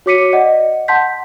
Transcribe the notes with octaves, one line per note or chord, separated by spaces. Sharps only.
F#4 C#5 D6 B6 C#7 D#7
D5 D#5 F#5
F#5 A5 C6 G6 B6